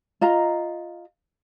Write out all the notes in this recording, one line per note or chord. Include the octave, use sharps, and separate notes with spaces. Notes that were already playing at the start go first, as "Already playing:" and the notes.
F4 D#5 A#5